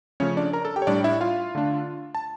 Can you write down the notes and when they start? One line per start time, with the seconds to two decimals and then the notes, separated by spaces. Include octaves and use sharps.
0.20 C#3 F3 A3 C#4 C#5
0.37 D4 D5
0.53 A#4 A#5
0.65 A4 A5
0.76 G4 G5
0.82 C#5
0.87 A2 G3 D4 D5
1.04 E4 E5
1.21 F4 F5
1.55 D3 A3 D4
2.15 A5